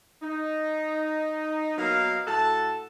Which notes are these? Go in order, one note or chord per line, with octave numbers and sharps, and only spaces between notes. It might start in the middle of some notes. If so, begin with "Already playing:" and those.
D#4
F#3 A#3 B3 A#4 D#5 F5
A2 F#4 A4 A5